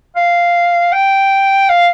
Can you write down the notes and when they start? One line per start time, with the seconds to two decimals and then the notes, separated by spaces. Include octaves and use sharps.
0.16 F5
0.93 G5
1.69 F5